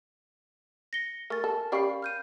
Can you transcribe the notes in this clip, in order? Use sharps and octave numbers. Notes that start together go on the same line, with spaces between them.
A#6 C#7 G7
A3 A#4 G#5 A6
A4
C#4 G4 D5 F5 B5 C7
F6 G6 D#7